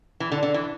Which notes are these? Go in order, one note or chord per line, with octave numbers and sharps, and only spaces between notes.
E3
D3
D3
E3